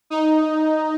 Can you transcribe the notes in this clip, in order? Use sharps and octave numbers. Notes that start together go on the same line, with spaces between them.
D#4